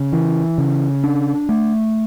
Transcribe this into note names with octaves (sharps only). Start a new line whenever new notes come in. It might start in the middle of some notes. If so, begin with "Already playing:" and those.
Already playing: C#3
E3
C#3
D4
A3